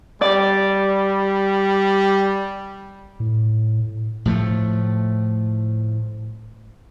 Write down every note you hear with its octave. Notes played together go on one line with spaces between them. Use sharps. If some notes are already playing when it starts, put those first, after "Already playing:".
G3 D5
A2
A2 F3 A3